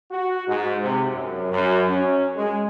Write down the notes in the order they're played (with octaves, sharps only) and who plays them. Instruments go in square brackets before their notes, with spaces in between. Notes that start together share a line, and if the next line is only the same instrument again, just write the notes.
[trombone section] F#4
G#2
C3
F#2
F#2
C#4
G#3